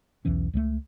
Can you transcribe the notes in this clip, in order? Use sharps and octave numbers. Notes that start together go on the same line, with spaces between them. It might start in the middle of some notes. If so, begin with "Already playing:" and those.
B1 E2 E3 C#4
C#2 F#3 A3